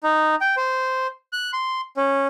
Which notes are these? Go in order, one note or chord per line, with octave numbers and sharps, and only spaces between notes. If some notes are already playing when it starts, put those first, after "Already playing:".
D#4
G5
C5
F#6
C6
C#4